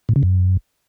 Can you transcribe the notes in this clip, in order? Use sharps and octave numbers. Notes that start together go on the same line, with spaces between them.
A2
C#3
F#2